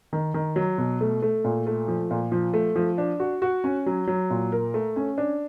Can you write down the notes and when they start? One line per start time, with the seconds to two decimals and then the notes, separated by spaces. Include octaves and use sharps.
0.13 D#3
0.34 D#3
0.56 F#3
0.78 B2
1.01 A3
1.22 A3
1.44 A#2
1.67 A3
1.88 F3
2.11 A#2
2.32 F3
2.54 A3
2.76 F3
2.98 D4
3.20 F#4
3.42 F#4
3.64 C#4
3.86 F#3
4.07 F#3
4.30 A#2
4.52 A#4
4.74 A3
4.96 C#4
5.18 D4